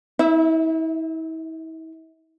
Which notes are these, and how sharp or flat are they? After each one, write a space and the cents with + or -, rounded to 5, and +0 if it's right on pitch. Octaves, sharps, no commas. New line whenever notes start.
E4 -40 E5 +0